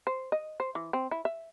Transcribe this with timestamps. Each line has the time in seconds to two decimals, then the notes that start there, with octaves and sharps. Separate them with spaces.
0.07 C5
0.32 D#5
0.60 C5
0.75 E3
0.93 C4
1.11 E4
1.25 E5